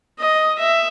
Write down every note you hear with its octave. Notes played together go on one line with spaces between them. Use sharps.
D#5
E5